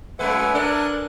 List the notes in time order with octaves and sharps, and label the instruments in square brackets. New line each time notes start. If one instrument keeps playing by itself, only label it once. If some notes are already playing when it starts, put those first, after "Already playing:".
[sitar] F#2 G#3 B4 [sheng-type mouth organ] E5 F#5 G#5
[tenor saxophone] D4 [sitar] A4 [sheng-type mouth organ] A#4 G#5 F#6